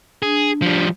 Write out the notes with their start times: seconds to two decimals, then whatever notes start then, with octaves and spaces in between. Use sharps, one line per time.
0.22 D4 G#4
0.62 F3 G3